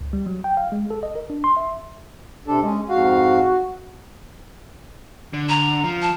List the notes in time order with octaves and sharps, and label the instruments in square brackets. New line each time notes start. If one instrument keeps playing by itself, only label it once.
[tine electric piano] C#2
G3
F#3
G5
F5
G#3
A4
D#5
A#4
D4
C6
E5
[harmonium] C3 A4 [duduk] D4
[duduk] G#3 [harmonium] C#4
[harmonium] F2 G#2 F5 [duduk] F#4
[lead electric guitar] D3
[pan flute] A#5
[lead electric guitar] F3
[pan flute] A5